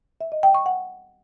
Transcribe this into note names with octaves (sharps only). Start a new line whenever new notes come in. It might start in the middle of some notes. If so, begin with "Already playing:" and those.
E5
D#5
G5
C#6
F#5